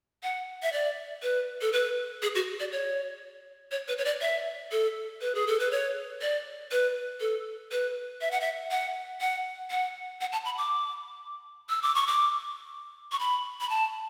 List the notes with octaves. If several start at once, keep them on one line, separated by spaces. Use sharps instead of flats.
F#5
E5
D5
B4
A4
B4
G#4
F#4
D5
C#5
C#5
B4
C#5
D5
E5
A4
B4
G#4
A4
B4
C#5
D5
B4
A4
B4
E5
F#5
E5
F#5
F#5
F#5
F#5
A5
B5
D6
E6
D6
C#6
D6
C#6
B5
B5
A5